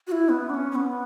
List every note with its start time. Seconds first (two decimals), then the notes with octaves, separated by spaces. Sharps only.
0.07 F#4
0.12 E4
0.29 B3
0.50 D4
0.54 C#4
0.71 C#4
0.75 B3